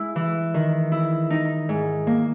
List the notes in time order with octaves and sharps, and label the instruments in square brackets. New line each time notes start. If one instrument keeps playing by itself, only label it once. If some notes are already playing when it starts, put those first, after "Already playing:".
Already playing: [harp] G#3 E4
E3
D#3
E4
D#4
G#2
A#3